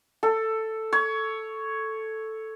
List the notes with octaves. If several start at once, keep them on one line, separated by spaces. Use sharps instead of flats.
A4
C#5